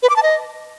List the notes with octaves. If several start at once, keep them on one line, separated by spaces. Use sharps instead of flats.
B4
D6
A5
D#5